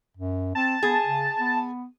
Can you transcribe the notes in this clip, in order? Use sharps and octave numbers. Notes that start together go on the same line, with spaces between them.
F#2
C4 A5
B3 G#4
C#3
B3